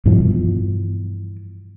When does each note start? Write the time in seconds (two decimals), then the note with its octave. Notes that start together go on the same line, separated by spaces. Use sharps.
0.06 G2 B2 E3 F3